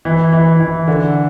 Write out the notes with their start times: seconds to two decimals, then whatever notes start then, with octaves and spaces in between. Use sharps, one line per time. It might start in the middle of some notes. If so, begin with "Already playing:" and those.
0.05 E3
0.33 E3
0.60 E3
0.88 D3